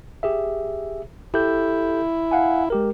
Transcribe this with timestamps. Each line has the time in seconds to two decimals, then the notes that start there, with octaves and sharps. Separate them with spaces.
0.23 G4 G#4 E5
1.34 E4 G4 A4 G6
2.31 F5 F#5 G#5
2.70 G#3 G4 A#4